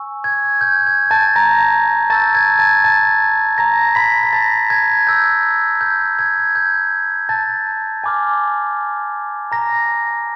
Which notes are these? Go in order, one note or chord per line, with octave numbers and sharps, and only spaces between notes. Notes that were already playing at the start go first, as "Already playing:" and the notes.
Already playing: G#5 C#6 E6
G#6
G6
G#6
A5 A6
A#5 A#6
A5 C#6 E6 G6 A6
G#6
A5 A6
A5 A6
A#5 A#6
B5 B6
A#6
A5 A6
G#6
B5 E6 G6
G6
G#6
G6
A5 A6
G#5 B5 D6 F6
A#5 A#6